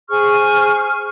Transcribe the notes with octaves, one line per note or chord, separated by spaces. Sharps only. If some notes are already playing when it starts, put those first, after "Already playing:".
G#4 C5 C#6 F6